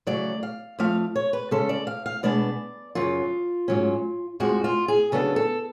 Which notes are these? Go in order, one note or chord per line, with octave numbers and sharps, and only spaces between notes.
C#3 F#3 A3 D5
F5
F2 F3 A3 F5
C#5
B4
C#3 G#3 C#4 A4
D5
F5
F5
B2 G#3 B3 D4 D5
F#2 C#3 F#3 F4
G#2 F#3 C#4
F2 F3 G#3 F#4
F4
G#4
C#3 F#3 B3 D4 A4
A4